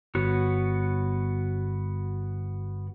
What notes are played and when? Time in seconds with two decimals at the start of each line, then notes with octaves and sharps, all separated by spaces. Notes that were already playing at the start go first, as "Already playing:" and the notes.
0.15 G1 B3 F#4 C#5